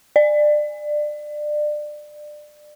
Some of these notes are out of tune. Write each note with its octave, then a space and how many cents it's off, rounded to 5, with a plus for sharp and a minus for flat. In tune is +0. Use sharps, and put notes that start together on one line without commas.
D5 +25